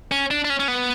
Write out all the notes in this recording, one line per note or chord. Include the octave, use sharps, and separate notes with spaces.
C#4
D4
D4
C#4
C#4
B3